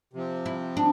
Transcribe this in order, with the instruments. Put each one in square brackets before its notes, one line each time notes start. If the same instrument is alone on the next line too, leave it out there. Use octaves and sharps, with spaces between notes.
[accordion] C3 F3 C4
[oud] E4
D4